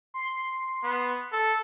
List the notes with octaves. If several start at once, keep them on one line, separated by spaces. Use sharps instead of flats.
C6
B3
A4